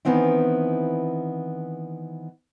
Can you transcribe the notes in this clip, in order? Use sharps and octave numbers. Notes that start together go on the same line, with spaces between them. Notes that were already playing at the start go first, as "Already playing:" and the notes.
D#3 E3 B3 C4 E4